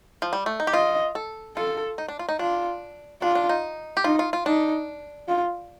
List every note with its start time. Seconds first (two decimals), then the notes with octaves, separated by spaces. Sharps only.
0.22 F3
0.33 G3
0.46 A3
0.60 D#4
0.67 G4
0.73 F4 D#5
1.15 A4
1.57 F4 A4
1.98 D#4
2.08 D4
2.19 F4
2.29 D#4
2.39 D4 F4
3.22 D4 F4
3.35 D4
3.49 D#4
3.97 G4
4.04 D#4 F4
4.19 F4
4.33 F4
4.46 D4 D#4
5.28 F4